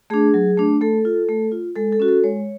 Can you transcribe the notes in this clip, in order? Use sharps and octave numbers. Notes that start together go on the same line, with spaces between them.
A3 D4 G#4
F#3
A3 D4
A3 A4
F4
A3
F4
G#3 A4
A4
C#4 F#4
A4
G#3 C#5